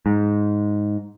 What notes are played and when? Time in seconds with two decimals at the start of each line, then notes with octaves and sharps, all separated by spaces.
0.06 G#2